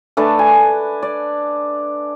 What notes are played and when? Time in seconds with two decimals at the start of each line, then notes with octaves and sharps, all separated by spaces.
0.17 A3 D4 B4 A5
0.39 G#5
1.03 D5